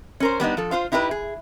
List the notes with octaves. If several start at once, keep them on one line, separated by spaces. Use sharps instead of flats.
C#4 A#4 C5
G3 B3 D4 D#4
F3 A4
F4 C5 F5
D#4 E4 G4 A#4 B4
G#4